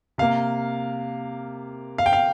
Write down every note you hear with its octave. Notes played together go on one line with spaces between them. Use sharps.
C3 A#3 F5
F5
G5
F5